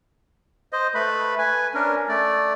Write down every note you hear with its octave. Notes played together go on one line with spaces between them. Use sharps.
C5 D#5
A3 B4 B5
B4 G#5
C#4 D4 A#4
A3 D5